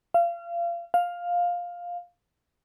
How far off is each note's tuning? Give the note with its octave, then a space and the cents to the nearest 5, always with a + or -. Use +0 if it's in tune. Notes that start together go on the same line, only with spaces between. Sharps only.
F5 -30
F5 +10